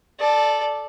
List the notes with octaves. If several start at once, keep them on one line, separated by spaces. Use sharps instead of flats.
A4 D5